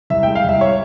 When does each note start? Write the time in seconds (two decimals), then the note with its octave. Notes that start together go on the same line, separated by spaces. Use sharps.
0.10 C2 E5
0.23 G5
0.27 G#3
0.35 F5
0.44 C2 E5
0.61 C#5